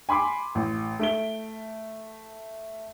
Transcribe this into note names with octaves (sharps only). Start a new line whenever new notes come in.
G#5 B5 C6 D6
A1
A3 D7 G7